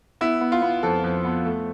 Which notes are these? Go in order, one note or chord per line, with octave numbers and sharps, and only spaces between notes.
B3 E4
B3
F4
B3
F2 A4
F2
B3
A3